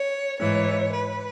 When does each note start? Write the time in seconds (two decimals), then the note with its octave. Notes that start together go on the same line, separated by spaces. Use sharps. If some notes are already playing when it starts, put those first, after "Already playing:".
Already playing: C#5
0.39 G#2 E3 C#5
0.92 B4